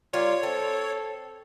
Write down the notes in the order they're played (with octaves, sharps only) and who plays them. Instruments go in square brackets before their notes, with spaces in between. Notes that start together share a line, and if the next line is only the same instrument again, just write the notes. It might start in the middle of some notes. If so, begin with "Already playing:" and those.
[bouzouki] G3 A#3 [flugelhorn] F4 [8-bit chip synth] C#5
[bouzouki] C4 [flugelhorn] A4